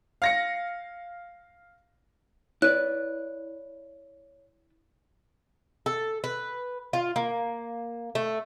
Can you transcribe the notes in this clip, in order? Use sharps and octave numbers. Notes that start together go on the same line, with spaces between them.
F5 A#6 C#7
E4 B4 C#5 D5 F#6
A4
B4
F4
A#3
A3